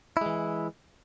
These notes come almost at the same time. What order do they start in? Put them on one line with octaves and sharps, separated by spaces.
E4 G#3 E3